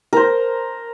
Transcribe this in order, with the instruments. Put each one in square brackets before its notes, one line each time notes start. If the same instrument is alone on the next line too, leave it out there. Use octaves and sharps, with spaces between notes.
[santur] A#4 C5